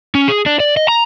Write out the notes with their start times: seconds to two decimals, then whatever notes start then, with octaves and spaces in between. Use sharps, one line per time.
0.15 C#4
0.28 G#4
0.46 D4
0.60 D5
0.77 D#5
0.88 A#5